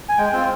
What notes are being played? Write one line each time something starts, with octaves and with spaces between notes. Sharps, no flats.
G#5
G#3 G5
C4 F4 G5